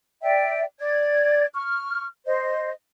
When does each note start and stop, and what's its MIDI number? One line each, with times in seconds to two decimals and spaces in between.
0.23 0.62 74
0.23 0.62 76
0.23 0.62 79
0.79 1.45 74
0.79 1.45 92
1.54 2.05 85
1.54 2.05 89
2.25 2.71 72
2.25 2.71 75